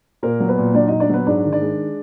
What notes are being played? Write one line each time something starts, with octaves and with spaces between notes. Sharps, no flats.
A#2 A#3 A#4
F#3
B3 B4
A#2
F#3 D4 D5
A#2 D#4 D#5
D4 D5
F#3 B3 B4
G#2 D4 D5
D#3
D4 D5
G#3